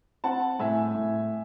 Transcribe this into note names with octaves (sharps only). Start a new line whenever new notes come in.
C4 F#5 A5
A2 E5 G#5
A2